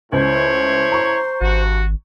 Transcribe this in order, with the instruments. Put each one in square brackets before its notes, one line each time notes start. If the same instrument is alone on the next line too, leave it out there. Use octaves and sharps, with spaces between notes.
[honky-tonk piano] C#2 [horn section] A2 E4 C#5 [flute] C5
[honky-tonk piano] A#5 C#6
[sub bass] G#1 [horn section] G2 F#4